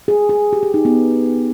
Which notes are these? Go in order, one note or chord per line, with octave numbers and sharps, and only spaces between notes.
G#4
G#4
G4
G4
D#4
B3